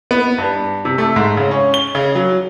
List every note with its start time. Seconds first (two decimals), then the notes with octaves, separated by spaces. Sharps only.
0.11 B3
0.38 G2
0.85 C3
0.98 A3
1.16 G#2
1.37 C#3
1.51 C#4
1.74 G7
1.95 C#3
2.15 F#3